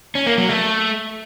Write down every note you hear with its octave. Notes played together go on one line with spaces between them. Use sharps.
C#4
A#3
F#3
A3